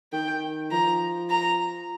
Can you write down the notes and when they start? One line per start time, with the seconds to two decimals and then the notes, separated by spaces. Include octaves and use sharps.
0.13 D#3 G5
0.71 F3 A#5
1.30 A#5